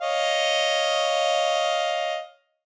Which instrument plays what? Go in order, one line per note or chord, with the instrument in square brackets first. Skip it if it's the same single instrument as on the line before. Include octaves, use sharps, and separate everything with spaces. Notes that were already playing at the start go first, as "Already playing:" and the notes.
[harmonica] C#5 D#5 F5